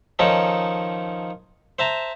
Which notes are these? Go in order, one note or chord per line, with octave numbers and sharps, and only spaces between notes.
D#3 F3 C#4 D#4 A4
C5 E5 A5 A#5